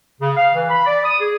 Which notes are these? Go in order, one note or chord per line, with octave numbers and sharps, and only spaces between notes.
C#3
F5
E3
B5
D5
D#6
G#4